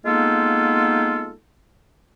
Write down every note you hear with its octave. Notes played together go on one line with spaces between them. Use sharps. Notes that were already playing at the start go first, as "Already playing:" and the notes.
G#3 A#3 B3 D#4 F4 A4